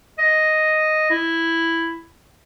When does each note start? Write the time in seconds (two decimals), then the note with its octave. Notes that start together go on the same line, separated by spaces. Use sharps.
0.18 D#5
1.10 E4